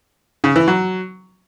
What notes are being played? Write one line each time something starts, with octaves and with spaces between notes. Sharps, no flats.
C#3
E3
F#3